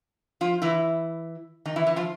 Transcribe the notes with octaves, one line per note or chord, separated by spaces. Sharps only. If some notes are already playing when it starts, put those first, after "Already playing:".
F3 F4
E3 E4
D#3 D#4
E3 E4
E3 E4
F3 F4